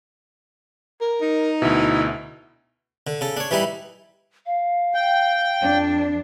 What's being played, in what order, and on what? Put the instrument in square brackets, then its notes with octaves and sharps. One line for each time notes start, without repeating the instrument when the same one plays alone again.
[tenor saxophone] A#4
[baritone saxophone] D#4
[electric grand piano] D2 B2 [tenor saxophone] E4
[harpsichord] D3
C#3 A4
D4 C#5
E3 G3 D#4 E4
[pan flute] F5
[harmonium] G5
[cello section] F2 D4